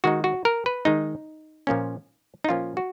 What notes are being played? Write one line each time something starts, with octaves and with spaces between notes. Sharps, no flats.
D#3 G#3 D#4 F#4
F#4
A#4
B4
D#3 G#3 D#4
A#2 F3 A#3 C#4
D#4
A#2 F3 A#3 C#4 F4
F#4